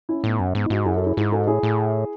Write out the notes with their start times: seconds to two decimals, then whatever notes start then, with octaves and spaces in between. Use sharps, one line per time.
0.09 C#4 E4
0.24 A2 B3 D#4
0.40 F#2 C#4
0.55 G#2 B3 D#4
0.65 E4
0.70 G#2 D#4 F#4
0.85 F#2 E4 G#4
0.96 F#4 A4
1.06 E4 G#4
1.17 G#2 E4 G#4
1.32 F#4 A4
1.47 A2 E4 G#4
1.63 A2